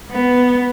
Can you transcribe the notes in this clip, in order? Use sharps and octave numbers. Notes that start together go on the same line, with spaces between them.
B3